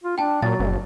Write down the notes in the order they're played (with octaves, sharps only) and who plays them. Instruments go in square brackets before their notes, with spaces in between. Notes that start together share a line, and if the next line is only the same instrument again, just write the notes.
[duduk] F4
[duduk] D4 [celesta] G5 A5
[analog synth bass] A#2 [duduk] F#3 [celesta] A6
[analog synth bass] F#1